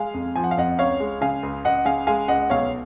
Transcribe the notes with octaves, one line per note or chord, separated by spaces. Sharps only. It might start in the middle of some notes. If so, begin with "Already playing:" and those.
Already playing: G#3 F5 G#5
F2
F3 G#5
F#5
F5
F2 D#5 F#5
C#2 C#5 F5
G#3
C#3 F5 G#5
C#2
C#2 D#5 F#5
C#3 F5 G#5
G#3 F5 G#5
C#2 D#5 F#5
B1 C#5 F5